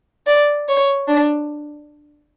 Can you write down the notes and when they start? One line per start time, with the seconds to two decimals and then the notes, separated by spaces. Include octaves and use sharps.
0.27 D5
0.68 C#5
1.08 D4